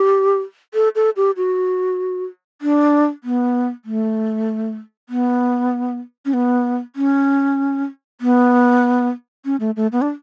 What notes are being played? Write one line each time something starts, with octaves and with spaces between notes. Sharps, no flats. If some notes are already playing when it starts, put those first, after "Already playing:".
Already playing: G4
A4
A4
G4
F#4
D4
B3
A3
B3
C#4
B3
C#4
B3
C#4
A3
A3
B3
D4